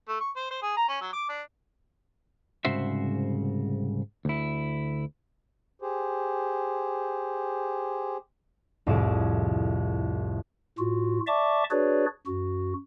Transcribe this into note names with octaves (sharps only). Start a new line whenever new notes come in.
A3
C#6
C5
C5
G#4
A#5
C#4
F#3
D6
D4
C2 G#2 C#3 F#4 C5 E5
D2 E4
G4 G#4 C5
C2 F2 A2 G#4 D7 E7
A2 F4 F#4
D5 E5 A5 C#6 D6
D4 F#4 G#4 B4 C#5 D5
F#2 F#4